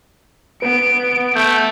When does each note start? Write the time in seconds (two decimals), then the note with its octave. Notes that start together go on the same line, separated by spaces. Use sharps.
0.62 B3 B4 D7
1.36 A3 G6